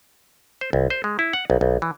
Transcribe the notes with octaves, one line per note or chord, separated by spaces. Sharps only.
C5
C2
C5
G#3
E4
F#5
B1
B1
E3